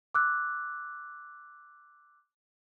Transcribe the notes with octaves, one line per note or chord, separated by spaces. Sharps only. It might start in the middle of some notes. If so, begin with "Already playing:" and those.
D6 E6 F#6